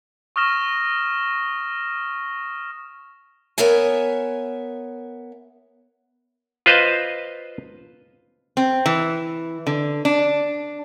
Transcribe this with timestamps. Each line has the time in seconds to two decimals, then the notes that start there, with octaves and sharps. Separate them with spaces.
0.36 C#6 D#6 F6 A#6 E7
3.58 B3 A#4 C#5 E5 G#5
6.66 F4 B4 C5 D#5 F5
8.57 C4
8.86 E3
9.67 D3
10.05 D4